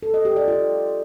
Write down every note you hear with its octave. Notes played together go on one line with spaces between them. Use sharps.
A4
D#5
G4
D5
F4